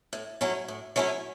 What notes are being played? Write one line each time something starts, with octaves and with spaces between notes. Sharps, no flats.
A2
F#3 A3 C#4 E4
A2
F#3 A3 C#4 E4